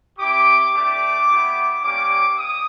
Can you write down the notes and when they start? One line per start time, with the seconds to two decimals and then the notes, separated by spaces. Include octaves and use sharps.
0.19 C4 E4 G4 D6
0.74 A3 D4 G4 D6
1.29 B3 E4 G4
1.83 G3 A#3 C#4 D6
2.38 D#6